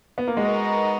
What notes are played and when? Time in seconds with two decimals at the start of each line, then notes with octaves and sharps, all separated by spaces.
0.18 B3
0.27 A#3
0.37 G#3 B3 D#4 F#4 A#4 D#5